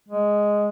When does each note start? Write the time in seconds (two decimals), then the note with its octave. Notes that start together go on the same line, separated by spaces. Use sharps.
0.09 G#3